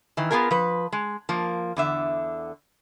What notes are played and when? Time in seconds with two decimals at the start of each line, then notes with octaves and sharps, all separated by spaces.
0.17 D#3 E3
0.31 B3 C#4 F4 G#4 A#4
0.51 F3 B4
0.92 G#3
1.29 F3 A#3
1.77 E2 D3 E5